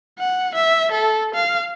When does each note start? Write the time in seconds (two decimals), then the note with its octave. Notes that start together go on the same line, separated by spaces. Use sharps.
0.19 F#5
0.55 E5
0.92 A4
1.34 F5